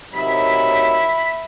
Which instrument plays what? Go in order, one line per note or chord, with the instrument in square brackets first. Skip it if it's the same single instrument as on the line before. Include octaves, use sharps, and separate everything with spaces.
[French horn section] C3 D#3 F#3 [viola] E5 [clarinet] B5 [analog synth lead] B6